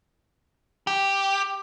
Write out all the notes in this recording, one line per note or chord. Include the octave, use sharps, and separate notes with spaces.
G4